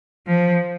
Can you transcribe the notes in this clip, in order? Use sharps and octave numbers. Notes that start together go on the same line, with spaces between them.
F3